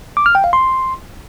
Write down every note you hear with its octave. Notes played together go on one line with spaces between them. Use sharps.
D6
F6
G5
F5
C6